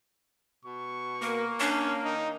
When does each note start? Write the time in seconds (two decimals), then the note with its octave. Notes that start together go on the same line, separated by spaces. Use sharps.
0.65 B2 C#6
1.22 A#3 A#4
1.60 C#4 D4
2.05 D#3 D#4